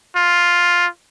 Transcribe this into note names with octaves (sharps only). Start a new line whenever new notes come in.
F4